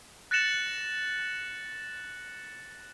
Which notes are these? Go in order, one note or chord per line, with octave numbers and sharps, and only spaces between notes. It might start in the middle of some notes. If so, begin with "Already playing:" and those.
F#6 A6 A#6 C#7 E7 F#7